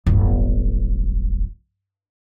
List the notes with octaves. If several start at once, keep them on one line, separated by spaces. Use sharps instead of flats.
D1 G1